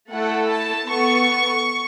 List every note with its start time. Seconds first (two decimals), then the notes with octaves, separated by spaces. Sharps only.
0.10 A3 E4 A4 F#5
0.49 A5
0.86 B3 A4 C#6